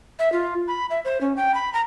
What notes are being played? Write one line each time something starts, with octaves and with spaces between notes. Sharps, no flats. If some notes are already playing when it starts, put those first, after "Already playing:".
E5
F4
B5
E5
C5
C#4
G5
B5
A#5